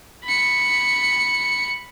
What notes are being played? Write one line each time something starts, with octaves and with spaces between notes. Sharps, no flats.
B5 C#7